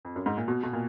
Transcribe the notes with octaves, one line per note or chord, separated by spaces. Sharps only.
F2
F#2
G#2
A#2
B2
B2
A#2